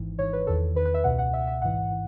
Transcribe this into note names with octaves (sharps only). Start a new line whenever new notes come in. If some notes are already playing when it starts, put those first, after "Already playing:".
Already playing: G#1 G#2 E3
G#1 G#2 E3 C#5
B4
E2 D#3 A4
D#3 B4
E2
B4
E5
C#2 B2 F#5
F#5
C#2 B2 E5
E5
A1 G#2 E3 F#5
E3